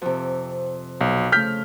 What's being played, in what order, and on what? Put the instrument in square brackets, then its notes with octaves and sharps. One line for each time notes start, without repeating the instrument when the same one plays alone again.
[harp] F2 C3
[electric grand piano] B1
[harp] C#3 A3 [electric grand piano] F6 G6 B6